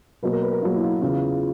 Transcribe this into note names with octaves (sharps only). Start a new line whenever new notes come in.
B2 F#3 A#3 B4
A#4
B4
A#4
B2 F#3 A#3 F4
E4
F4
E4
E2 C#3 E3 F4